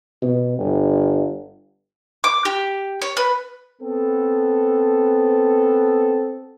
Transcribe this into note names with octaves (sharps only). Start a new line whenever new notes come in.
B2
G1
D6
G4
C#5
B4
B3 C4 A4